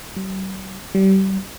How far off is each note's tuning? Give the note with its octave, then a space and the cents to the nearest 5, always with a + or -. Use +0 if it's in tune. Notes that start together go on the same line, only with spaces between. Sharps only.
G3 -45
G3 -30